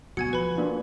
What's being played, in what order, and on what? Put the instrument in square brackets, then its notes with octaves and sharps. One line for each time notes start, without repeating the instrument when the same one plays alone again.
[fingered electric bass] D2 B2 F#3 [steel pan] F#4 [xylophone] G#5 G#6 C#7
[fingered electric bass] F3 [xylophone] B4 B5
[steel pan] A#3 D4 F4